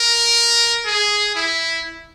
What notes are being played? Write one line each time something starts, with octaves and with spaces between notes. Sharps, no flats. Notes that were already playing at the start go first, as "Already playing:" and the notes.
Already playing: A#4
G#4
E4